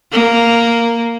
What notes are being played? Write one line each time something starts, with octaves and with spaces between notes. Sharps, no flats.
A#3